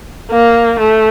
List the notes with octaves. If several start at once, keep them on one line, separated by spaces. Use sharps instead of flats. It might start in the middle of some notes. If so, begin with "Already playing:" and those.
A#3
A3